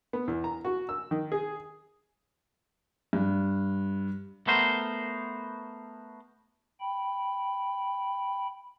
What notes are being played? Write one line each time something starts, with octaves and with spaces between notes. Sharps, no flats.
B3
E2
A#5
F#4
E6
D#3
G#4
G2
A3 B3 A#4 C5
G5 B5